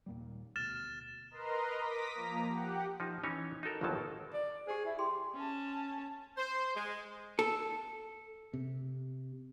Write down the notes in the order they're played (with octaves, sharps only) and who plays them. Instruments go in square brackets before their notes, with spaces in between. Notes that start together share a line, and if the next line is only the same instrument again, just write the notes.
[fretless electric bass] D#2 A#2 G3
[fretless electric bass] D2 B2 [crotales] F6 A6 E7
[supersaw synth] A#4 B4 D#5 A#5 C6
D6 D#6 A#6 B6
F3 A#3 A#5
G4 F#5
[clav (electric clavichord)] F3 D#4
E3 C#4 D#4 C#5
D#4 F#4 A4 A#4
G1 D#2 B2 F3 F#3 A5
[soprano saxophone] D5
[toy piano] G4 C5 [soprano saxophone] G#4
[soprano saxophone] E4
[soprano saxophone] G4 [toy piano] G#4 C6
[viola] C#4 A5
[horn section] C5
G#3
[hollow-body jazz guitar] A4
[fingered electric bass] C3